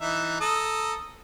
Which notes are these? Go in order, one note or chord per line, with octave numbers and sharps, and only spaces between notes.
E3 D#4 E5
A4 A#5 D#6